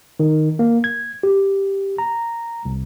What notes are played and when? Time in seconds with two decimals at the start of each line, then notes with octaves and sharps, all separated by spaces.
0.20 D#3
0.59 A#3
0.84 G#6
1.23 G4
1.98 A#5
2.65 C2